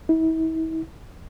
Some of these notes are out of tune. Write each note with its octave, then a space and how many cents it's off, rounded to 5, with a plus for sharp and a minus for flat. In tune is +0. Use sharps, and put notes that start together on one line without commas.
E4 -40